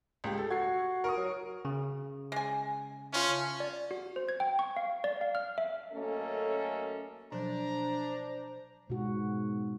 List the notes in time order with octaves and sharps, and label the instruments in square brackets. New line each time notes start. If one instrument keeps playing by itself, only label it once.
[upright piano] C#2 G4
A4
[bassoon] F#4 [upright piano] G#6 C7
[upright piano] A#4 C#6 D#6
[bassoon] F#3
[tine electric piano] C#3
[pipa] G#3 G#5
[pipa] A3 F4 [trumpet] C#4
[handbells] D5
F#4
C5
G#6
G5
C#6
F5
D5
F5
F6
E5
[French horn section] F#2 A3 A#3 C#4 A4 D#5
[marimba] B2 F3 F#3 [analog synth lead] D4 [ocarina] C5 [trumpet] A#5
[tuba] G#2 [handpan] B2 F#4